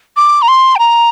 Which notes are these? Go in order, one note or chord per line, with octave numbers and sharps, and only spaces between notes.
D6
A#5
C6
G5
A#5